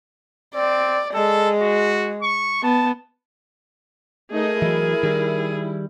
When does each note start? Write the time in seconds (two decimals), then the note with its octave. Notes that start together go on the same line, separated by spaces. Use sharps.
0.55 C4 D5
1.14 G#3 A4
1.61 F#4
2.22 C#6
2.63 B3 A5
4.32 A3 D#4 G#4 A#4 D#5
4.62 E3 F#3 E4
5.03 D#3 G3